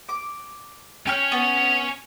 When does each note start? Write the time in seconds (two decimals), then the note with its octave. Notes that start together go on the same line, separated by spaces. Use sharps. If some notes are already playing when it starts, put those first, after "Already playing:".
0.09 D6
1.07 C#4 C#5 G5 C#6 F6
1.32 B3